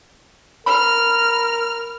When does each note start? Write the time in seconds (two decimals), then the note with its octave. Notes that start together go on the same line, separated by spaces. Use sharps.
0.66 A#4 B5 F6